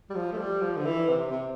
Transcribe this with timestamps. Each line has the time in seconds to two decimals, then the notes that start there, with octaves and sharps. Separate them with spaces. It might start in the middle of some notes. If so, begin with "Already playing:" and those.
0.10 G3
0.15 F3
0.32 A3
0.37 G3
0.61 F3
0.77 D3
0.85 E3
1.09 C3
1.31 C3